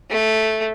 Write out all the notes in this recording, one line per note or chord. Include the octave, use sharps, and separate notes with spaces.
A3